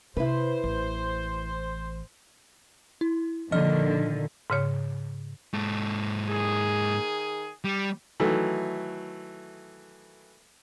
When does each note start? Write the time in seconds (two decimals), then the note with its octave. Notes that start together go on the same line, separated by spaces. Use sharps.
0.17 C3 E4 B4 C5
0.64 A1
3.01 E4
3.52 A#2 D3 D#3 F3 D#5 F6
4.50 G#2 C#3 C#5
5.53 G#2 A4
6.29 D#3 G#4
7.64 G3
8.20 D#3 E3 F#3 A3